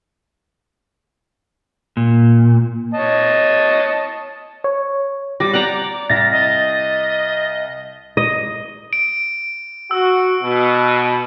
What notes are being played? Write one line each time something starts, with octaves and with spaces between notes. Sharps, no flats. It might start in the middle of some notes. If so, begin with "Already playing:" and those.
A#2
C#5 D#5 A5
C#5
G3 D6 A#6
D5 F#5 G5 A#5
C2 A6 A#6
D#5
D#5
D7
F#4 E6
B2